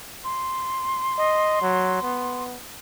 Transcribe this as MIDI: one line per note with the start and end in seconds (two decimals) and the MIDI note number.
0.24 2.44 84
1.18 1.62 75
1.62 1.98 54
2.03 2.58 59